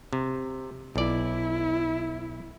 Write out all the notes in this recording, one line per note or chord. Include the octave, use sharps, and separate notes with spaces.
C3
B1 E4 D5